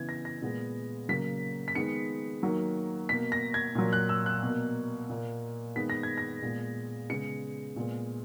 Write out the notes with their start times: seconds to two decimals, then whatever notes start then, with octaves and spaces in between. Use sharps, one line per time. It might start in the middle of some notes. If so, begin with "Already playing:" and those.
Already playing: C#3 E3 B3 G#6
0.09 A#6
0.25 A#6
0.42 A#2 G#3 B3
1.09 C#3 F#3 A#3 B6
1.68 B6
1.75 D#3 G#3 B3 C#7
2.42 D#3 F#3 A#3
3.09 B2 A#3 B6
3.32 A#6
3.54 G#6
3.75 A#2 F#3 A#3
3.93 F#6
4.09 E6
4.26 F#6
4.43 B2 A#3
5.09 A#2 A#3
5.76 D#3 G#3 B3 B6
5.90 A#6
6.03 G#6
6.18 A#6
6.42 A#2 G#3 B3
7.09 C#3 G#3 B3 C#7
7.76 A#2 G#3 B3